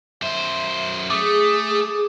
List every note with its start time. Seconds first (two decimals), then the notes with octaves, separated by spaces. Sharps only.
0.22 F#2 C5 E5
1.10 A3 G#4 D6 D#6